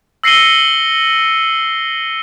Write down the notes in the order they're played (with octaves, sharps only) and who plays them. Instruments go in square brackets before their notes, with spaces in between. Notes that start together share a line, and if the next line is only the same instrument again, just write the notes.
[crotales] E6 A#6 C7 C#7 D#7 G7